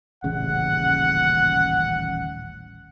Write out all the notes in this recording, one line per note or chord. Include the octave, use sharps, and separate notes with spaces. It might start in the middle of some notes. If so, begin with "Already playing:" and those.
D#1 A1 C#3 F#5